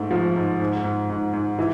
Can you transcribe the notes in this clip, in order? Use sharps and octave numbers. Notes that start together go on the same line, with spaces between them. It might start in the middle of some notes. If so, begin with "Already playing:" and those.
Already playing: G#2 A3
F3
G#2
G#2
G#2
G#2
G#2
E3